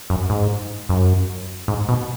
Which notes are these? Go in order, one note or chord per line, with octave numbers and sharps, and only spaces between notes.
F#2
G#2
F#2
G#2
B2